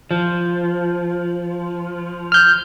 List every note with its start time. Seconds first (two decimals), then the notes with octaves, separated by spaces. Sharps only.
0.11 F3
2.32 F6 G6